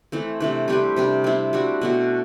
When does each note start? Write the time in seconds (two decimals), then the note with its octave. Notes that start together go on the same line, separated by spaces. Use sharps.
0.12 E3 A3 C4
0.40 C3 E3 A3 D4
0.68 G3 C4 G4 B4
0.96 C3 G3 D4
1.24 G3 C4 E4
1.53 G3 D4 F#4
1.81 B2 A3 D4 F#4